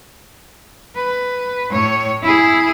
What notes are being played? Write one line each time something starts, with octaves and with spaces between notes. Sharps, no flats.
B4
A2 C#5
E4 G#4